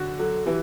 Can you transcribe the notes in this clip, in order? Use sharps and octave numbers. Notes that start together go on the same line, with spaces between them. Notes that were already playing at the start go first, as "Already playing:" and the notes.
Already playing: D3 F#4
F#3 A4
E3 G4